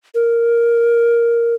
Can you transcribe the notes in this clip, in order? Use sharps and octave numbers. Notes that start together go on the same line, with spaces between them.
A#4